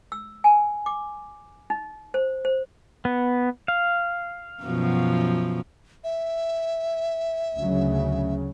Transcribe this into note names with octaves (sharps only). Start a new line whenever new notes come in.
E6
G#5
D6
D#4
C5
C5
B3
F5
F#2 B2 F3
E5
D2 C#3 F#3